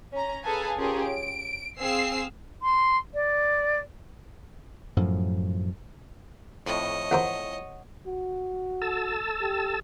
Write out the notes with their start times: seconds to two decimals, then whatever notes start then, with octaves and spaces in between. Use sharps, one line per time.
0.12 C#4 A#5
0.44 G#4 A4 B4 F5 G#5
0.78 C#4 F4 G4 G#4 A#4
1.07 D7
1.79 C4 G#4 F5 E6 C7
2.62 C6
3.14 D5
4.97 F#2 A2 F3
6.66 F2 A2 C#5 D#5
7.11 E2 A#4 C5 F#5
8.07 F#4
8.82 A4 A5 E6
9.41 G4